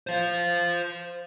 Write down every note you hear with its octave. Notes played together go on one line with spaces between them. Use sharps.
C5 F5